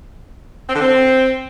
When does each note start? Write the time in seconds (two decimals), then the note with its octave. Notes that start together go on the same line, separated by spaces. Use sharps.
0.68 C4
0.74 D3
0.80 C4